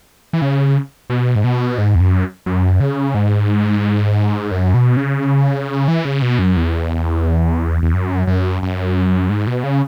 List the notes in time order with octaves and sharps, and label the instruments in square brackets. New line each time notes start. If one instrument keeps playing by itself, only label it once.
[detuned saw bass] E3
C#3
B2
G#2
B2
G#2
E2
F#2
F#2
C#3
G#2
F#2
B2
C#3
E3
C#3
B2
F#2
E2
E2
F#2
F#2
F#2
G#2
B2
C#3